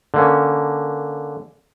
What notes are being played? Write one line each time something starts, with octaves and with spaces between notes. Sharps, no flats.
D3 A#3 C#4